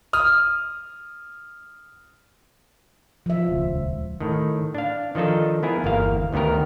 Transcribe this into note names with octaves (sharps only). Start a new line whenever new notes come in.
D#6 F6
F3 E5
D#1 C#2
A2 D#3
D4 F5
D#3 F3 D4 D#4 A4
B3 E4 G#4 A#4
G1 E2 A#3 A#4 F5
D2 D#3 B3 G4 A#4